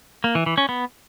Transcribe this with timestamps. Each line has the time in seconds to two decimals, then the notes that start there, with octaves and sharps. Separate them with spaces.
0.24 A#3
0.35 E3
0.46 E3
0.58 C#4
0.69 B3